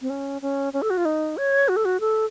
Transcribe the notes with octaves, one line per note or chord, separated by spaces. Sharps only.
C4
C#4
C#4
C#4
A4
F#4
F4
D#4
C#5
F#4
A4
F#4
A4